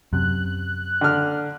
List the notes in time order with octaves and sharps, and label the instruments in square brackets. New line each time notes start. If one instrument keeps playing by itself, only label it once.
[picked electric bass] F#2 C3 [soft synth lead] F#6
[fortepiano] D3 F6